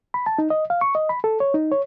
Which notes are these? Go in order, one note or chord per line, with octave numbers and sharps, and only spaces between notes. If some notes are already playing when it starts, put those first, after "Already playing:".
B5
A5
D#4
D#5
F5
C#6
D#5
B5
A4
C#5
D#4
C#5